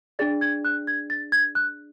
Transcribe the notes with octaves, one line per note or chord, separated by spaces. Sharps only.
D4 G#4 D5 A6
G#6
F#6
G#6
A6
G#6
F#6